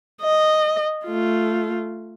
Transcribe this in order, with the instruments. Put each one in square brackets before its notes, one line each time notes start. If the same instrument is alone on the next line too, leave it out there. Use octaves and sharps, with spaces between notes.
[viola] D#5
A3 F4